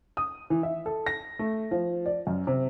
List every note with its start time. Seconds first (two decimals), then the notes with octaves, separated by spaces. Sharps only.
0.17 D#6
0.50 E3
0.63 E5
0.86 A4
1.06 A#6
1.39 A3
1.71 F3
2.06 D5
2.27 F#2
2.47 C3